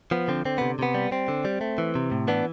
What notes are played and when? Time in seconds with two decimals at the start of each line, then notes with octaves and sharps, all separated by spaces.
0.11 F3 B3
0.28 D3 C4
0.45 D3 C4
0.58 C3 B3
0.79 C3 B3
0.94 G3
1.11 G3 C4
1.28 D3
1.45 G3
1.61 A3
1.78 E3
1.95 C3
2.12 A2
2.28 E3 B3 D4